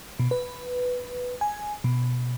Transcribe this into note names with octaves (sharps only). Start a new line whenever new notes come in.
B2
B4
G#5
B2